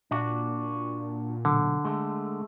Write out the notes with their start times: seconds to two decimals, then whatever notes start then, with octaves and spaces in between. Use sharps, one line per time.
0.11 A#2 D4 F#4
1.45 B1 D3
1.85 G#3 A3